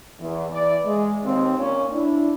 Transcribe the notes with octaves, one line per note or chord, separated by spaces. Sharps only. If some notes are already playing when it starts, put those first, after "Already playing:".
E2
E3 D5
G#3
D#2 C4
A#2 C#4
D4 E4